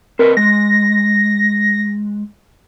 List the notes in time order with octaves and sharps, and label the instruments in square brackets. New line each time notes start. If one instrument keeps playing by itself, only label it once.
[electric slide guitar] C4 B4 D#5 [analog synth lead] A#4
[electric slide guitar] G#3 [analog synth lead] A#6